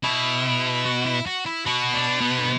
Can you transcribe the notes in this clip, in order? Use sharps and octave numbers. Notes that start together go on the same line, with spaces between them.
B2 E4
F#4
E4
F#4
E4
B2 F#4
D4
B3
D3